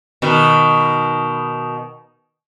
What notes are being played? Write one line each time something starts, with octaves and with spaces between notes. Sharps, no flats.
B2 D#3